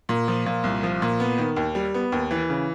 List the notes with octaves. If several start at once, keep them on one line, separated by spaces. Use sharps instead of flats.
A#2
F3
A#2
C2
F3
A#2
B3
D#3
D#2
G3
B3
D#2
E3
C#3